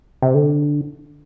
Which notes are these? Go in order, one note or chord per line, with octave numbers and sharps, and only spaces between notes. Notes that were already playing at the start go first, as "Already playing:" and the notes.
C3
D3